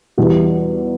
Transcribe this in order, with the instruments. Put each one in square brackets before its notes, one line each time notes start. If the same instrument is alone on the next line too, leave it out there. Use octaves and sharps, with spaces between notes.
[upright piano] E2 B2 G3 B3 E4